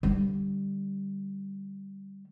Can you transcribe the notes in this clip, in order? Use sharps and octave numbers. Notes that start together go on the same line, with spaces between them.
D3 G3